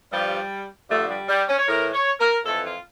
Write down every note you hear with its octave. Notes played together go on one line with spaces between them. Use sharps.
G2 F3 G3
G2 D3 F3 A3
G3
G3
C#4
C#5
A2 E3 A#4
C#5
A#4
F2 E3 A4
F4